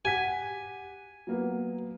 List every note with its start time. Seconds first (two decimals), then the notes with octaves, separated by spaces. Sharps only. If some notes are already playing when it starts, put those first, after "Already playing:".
0.05 G4 F#5 G#5 B6
1.27 F#3 A#3 B3